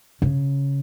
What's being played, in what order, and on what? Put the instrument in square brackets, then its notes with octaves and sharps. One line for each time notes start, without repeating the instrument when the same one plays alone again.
[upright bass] C#3